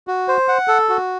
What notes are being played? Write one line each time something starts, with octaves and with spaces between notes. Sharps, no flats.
F#4
C5
F#5
A4
F#4